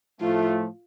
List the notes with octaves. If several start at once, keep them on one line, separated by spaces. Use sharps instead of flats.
A2 F3 A3 F4